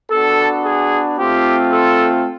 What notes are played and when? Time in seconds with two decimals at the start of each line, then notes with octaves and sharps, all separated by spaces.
0.11 B3 D4 F#4 A4
0.65 G#4
1.19 A3 C4 F4 G4
1.72 A4